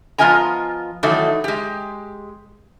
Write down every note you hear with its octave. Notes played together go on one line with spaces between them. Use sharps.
F3 B3 F4 D#5 G#5 A#5
D#3 E3 F#3 A3 D#4
G#3 G4